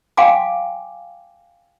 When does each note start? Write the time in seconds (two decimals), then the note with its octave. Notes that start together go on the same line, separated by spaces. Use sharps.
0.17 F5 G5 G#5 C6 D6